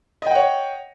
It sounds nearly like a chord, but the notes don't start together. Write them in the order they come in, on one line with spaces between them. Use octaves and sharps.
D#5 G5 F#5 C#5